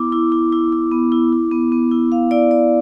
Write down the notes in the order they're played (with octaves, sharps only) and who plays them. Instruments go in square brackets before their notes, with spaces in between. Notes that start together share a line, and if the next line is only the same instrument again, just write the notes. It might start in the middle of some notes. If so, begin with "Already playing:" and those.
Already playing: [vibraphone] B3 E4 D6
E4
E4
E4
E4
B3
E4
E4
B3
B3
E4
B3 F5
E4 D5
B3 D5